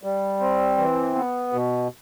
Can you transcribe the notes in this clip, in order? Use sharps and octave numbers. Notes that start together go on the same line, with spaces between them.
G3
C4
E3
B3
B2